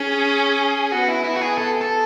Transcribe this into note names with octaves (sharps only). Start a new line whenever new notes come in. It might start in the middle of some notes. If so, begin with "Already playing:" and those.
Already playing: C#4 G#4
B3 F#4
E4
E4
F#4
G#4
B3 A4
A4